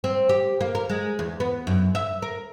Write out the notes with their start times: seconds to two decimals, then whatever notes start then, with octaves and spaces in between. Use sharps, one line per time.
0.04 C4
0.29 G4
0.61 A#3
0.75 A#4
0.90 G#3
1.19 E2
1.40 B3
1.67 F#2
1.95 E5
2.22 A#4